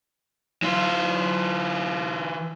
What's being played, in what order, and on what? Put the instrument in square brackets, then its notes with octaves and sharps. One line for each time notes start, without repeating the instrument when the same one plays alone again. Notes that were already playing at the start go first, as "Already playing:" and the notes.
[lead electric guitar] E3 F4